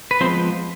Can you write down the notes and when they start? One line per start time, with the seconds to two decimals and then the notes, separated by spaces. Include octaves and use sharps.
0.11 B4
0.20 F3 G#3 B3 C4 C5